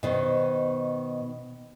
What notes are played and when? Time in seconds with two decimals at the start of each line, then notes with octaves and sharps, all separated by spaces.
0.03 B2 D#3 C5